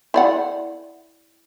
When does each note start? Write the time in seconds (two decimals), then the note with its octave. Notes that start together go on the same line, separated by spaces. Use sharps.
0.14 E4 D5 F#5